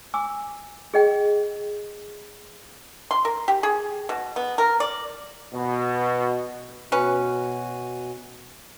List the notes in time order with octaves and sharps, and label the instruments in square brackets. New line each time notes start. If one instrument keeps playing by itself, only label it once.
[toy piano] G#5 D6 E6
G#4 D#5 G5
[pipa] C6
A#4
G4
G#4
B2
B3
A#4
D5
[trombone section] B2
[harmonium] B2 F#4 G#5 [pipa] C#4 B4